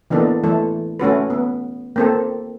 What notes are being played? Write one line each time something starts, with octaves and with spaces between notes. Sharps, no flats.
E3 A#3 B3 D4 A4
E3 A3 A4
A3 C#4 F#4 B4
B3
A#3 C4 A4